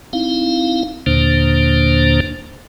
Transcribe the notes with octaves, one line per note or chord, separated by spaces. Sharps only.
C4 D#4 E4 F5
D#2 A#2 D3 A#3 D4 C5